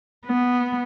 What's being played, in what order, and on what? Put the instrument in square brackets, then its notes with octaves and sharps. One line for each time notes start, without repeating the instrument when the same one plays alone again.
[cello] B3